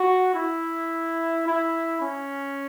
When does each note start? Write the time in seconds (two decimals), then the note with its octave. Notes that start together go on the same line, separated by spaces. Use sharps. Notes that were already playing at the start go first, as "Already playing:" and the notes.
Already playing: F#4
0.34 E4
1.46 E4
2.01 C#4